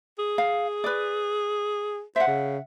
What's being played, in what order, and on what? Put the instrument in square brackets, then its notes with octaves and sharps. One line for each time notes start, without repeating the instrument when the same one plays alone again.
[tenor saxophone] G#4
[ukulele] F5
B4 D5
[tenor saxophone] C5 [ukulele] E5 F#5
[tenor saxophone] C#3